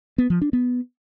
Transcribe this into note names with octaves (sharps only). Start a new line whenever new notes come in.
B3
F3
D4
B3